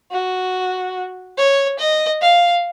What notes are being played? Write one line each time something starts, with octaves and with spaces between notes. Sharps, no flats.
F#4
C#5
D#5
F5